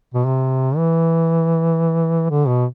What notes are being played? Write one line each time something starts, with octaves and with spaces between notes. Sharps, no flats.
B2
C3
E3
D3
B2